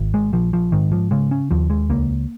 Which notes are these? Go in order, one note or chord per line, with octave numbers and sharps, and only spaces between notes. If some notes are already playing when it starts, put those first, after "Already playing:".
Already playing: G#1
G#3
A#1 F3
F3
G#2 D#3
F3
C#3 G#3
C#4
D#2 F3
G#3
C#2 A#3